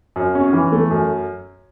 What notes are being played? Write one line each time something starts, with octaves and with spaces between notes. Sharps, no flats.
F#2
C#4
E3
A3
F#2